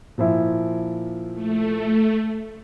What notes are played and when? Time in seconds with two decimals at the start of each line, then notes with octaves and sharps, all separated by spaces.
0.18 A#2 F3 E4
1.34 A3